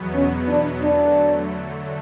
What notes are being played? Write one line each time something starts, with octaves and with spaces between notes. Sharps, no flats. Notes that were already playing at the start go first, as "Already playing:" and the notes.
Already playing: E2 B2 F#3 B3
C#4
D4
D3 F#3 A3 D4